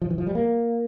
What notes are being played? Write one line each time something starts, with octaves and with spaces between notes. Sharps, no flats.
F3
E3
F3
G3
A#3